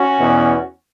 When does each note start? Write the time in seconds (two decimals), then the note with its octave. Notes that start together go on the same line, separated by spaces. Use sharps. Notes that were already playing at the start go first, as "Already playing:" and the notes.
Already playing: C#4 F#4
0.18 E2 B2 B3